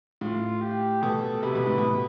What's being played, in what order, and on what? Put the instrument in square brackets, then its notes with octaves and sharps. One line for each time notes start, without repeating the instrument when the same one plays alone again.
[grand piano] A2 [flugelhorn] F4
[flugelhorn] G4
[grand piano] B2 [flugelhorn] A4
[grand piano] C3 [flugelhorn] B4
[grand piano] B2
A2
B2